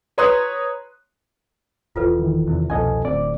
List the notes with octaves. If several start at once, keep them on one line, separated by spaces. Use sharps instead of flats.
B4 C#5 A#5 C6 D#6 F#6
E1 E2 F4 A4 B4
D#3 E3
E2 C3
C2 F2 B2 C#4 A4 D#5 G#5
D1 D2 C4 D5 D6